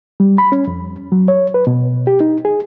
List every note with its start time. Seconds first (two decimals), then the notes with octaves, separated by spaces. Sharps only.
0.20 G3
0.38 B5
0.52 C#4
0.67 F2
1.12 F#3
1.28 C#5
1.54 B4
1.67 B2
2.07 G4
2.20 D#4
2.45 G#4